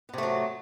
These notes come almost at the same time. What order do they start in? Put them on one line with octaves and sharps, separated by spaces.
B3 C3 A3 F#3